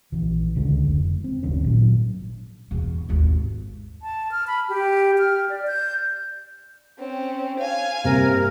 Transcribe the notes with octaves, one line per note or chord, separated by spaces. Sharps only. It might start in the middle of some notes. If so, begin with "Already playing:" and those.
A#1 E3
D1 C#2 D3 G#3
F1
C4
F#1 D2 D#3 C#4
G#1 A#2 F#3
E2 B2
G#1 D#2
A5
F6
B5
G4
F6
D5
G6
C4 C#4
F5 G#5
G2 C3 A#3 A#4